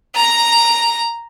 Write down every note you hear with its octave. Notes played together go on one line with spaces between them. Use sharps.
A#5